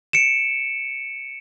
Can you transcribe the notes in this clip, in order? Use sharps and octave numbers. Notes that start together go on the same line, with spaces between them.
C#7 D7 E7